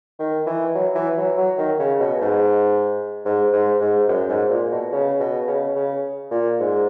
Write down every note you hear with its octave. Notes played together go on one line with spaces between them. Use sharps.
D#3
E3
F#3
E3
F#3
F#3
D#3
C#3
B2
G#2
G#2
G#2
G#2
F#2
G#2
A#2
B2
C#3
B2
C#3
C#3
A#2
G#2